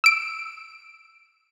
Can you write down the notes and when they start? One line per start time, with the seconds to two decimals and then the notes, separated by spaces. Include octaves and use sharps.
0.04 E6 D7